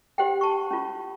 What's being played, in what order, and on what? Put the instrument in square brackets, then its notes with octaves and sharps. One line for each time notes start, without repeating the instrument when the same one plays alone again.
[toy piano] G4 C5 F#5 G5
A5 C#6
C#4 F4